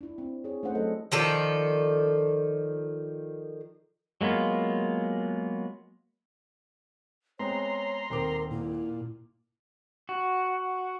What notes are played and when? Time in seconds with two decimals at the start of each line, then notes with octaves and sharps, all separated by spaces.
0.01 D4 E4
0.18 C4
0.44 G#4 C#5
0.63 A3 C#4 D4 C5 F#5
0.75 F#3 A4 D#5
1.12 D#3 F3 A4 D5
4.21 F#3 G#3 A#3 B3 F4
7.39 G#3 B3 C4 C#5 A#5 C6
8.10 D#1 C4 A#4 D6
8.51 A#2 E4
10.09 F#4